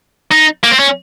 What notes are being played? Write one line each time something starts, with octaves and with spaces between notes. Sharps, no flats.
D#4
A#3
C4
C#4